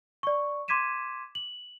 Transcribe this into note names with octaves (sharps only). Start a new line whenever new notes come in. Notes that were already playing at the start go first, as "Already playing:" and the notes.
D5 C#6
C6 D6 G#6 B6 D#7 E7
F#7